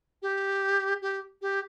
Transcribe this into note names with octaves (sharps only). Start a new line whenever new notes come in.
G4
G4
G4